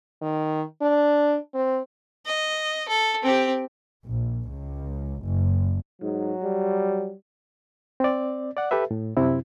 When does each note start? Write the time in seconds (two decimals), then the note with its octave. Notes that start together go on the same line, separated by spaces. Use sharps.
0.21 D#3
0.81 D4
1.54 C4
2.26 D#5
2.89 A4
3.23 C4 G4
4.04 A#1
4.49 C#2
5.25 F#1
6.02 G#2 F#3
6.43 G3
8.00 C4 D5
8.57 D5 F#5
8.71 G4 A4 B4 E5
8.91 A2
9.17 F#2 C3 C4 E4